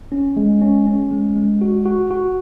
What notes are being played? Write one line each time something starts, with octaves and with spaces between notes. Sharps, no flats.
C#4
G#3
C#4
C#4
G#3
G#3
F#4
F#4
F#4